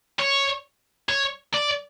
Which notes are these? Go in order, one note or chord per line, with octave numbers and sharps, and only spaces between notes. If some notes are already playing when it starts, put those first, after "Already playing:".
C#5
C#5
D5